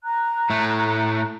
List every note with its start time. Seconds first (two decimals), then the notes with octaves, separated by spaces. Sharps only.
0.03 A#5 F#6
0.50 A2 A3